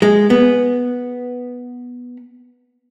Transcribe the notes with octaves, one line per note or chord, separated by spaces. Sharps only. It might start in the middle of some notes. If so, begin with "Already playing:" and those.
G#3
B3